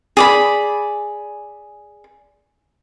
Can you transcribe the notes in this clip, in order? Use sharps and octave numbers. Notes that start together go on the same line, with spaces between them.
G#4 D5 B5